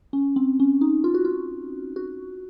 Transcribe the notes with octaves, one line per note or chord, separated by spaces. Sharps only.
C#4
C4
C#4
D#4
F4
F#4
F4
F#4